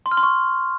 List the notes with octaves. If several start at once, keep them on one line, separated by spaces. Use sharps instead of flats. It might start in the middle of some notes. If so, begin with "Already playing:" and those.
C6
F6
C6
C#6